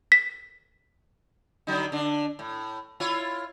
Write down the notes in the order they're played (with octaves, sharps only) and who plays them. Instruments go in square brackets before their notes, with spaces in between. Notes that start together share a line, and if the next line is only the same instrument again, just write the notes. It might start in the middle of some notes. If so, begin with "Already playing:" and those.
[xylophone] B6
[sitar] D3 F#3 D#4
D3 D4
A2
E4 F4 C#5